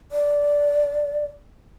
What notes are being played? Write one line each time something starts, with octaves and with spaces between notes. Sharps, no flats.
D5